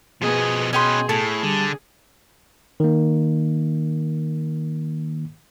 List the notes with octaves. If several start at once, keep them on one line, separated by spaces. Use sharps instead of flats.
B2 F3 B3 G#4 D#5
C#4 G#4 B4 D#5 G5 C6
A2 A4 A5
D3 G3
D#3 A#3